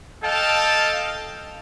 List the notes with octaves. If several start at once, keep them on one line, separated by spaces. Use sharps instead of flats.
A4 D#5 F5 G5 A5